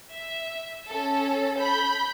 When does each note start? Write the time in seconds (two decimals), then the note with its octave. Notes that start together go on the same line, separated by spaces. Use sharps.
0.12 E5
0.87 C#4 A4
1.57 B5 G6